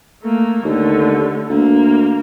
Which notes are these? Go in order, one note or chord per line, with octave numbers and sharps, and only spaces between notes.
A3 A#3
D#2 D3 A3
D2 A#3